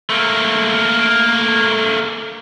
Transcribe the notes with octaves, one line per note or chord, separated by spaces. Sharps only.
A3 A#3